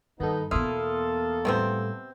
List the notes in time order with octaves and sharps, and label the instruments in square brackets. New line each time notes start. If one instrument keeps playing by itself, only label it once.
[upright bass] G2 [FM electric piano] D#3 A4 [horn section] B3 D#4
[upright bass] E2 B2 [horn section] A#3 A4 [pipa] E4 [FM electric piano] C6 D#6 F6
[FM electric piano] A2 G3 [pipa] C3 B3 C4